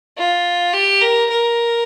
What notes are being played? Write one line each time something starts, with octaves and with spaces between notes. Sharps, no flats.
F4
G4
A#4
A#4